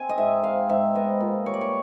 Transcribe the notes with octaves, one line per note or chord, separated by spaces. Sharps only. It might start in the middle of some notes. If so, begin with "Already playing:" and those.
Already playing: C4 G#5
D#5
G#2 E5
C4 F5
G#2 E5
B3 D#5
A#2
G3 C#5
D5
C#5